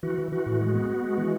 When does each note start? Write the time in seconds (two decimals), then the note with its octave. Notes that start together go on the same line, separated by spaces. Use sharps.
0.03 E3 F#4
0.18 E3
0.32 E3 F#4
0.46 A2
0.61 G#3
0.74 B3
0.89 B3
1.04 G#3
1.18 E3